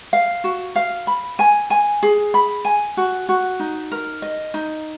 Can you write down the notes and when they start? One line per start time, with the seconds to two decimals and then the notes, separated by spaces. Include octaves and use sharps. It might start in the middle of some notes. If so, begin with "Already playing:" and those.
0.13 F5
0.44 F#4
0.76 F5
1.07 B5
1.39 G#5
1.70 G#5
2.03 G#4
2.34 B5
2.65 G#5
2.97 F#4
3.29 F#4
3.60 D#4
3.92 A#4
4.22 D#5
4.54 D#4